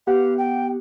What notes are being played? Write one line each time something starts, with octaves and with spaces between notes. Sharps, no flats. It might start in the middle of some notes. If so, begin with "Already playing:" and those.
B3 G4 F5 F#5
G5